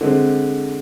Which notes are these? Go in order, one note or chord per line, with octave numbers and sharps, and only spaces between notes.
D3 G#3 C4